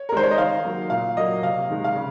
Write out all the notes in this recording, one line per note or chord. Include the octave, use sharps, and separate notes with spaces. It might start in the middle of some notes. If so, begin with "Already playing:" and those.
Already playing: C#5
A#4
D#3 G#3 C5
C#5
D#5
D#3 F5
F#3 A#3
A#2 F5
F#3 A#3 D#5
C3 F5
D#3 G#3
F5
C#3